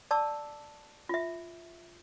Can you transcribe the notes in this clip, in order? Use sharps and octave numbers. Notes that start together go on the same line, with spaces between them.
D5 A5 D6 E6
F4 E5